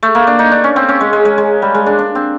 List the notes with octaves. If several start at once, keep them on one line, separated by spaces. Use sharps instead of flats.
A3
A#3
D4
D#4
D4
C#4
C4
C#4
G#3
G#3
G#3
G#3
G3
G#3
D4
D4
C4